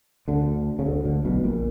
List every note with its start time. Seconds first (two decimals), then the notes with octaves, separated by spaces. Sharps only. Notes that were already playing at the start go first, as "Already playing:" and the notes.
0.28 D2 D3
0.79 C#3
0.86 D2 D3
1.05 D2 D3
1.25 B1 B2
1.44 A#1 A#2